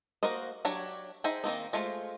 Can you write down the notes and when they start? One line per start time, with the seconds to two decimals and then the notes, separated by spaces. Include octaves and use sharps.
0.23 A#3 F#4 A#4 C5 D#5
0.65 F#3 D4 G4 C#5 A#5
1.24 D#4 G#4 C5 E5 G5
1.44 D#3 A#3 C4 D#4
1.73 G#3 A3 F4 C5